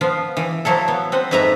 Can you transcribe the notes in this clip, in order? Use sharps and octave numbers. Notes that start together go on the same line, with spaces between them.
F3 B3 F4
E3
F3 F#3 E4 A4
B3
C4 B4 F#5
F2 G#2 B4 E5 A5 A#5